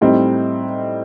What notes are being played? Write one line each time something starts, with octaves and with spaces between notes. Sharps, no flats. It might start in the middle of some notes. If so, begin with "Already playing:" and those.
A2 G3 C4 D#4